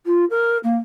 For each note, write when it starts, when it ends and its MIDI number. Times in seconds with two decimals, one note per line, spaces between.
0.06 0.25 65
0.30 0.58 70
0.63 0.76 58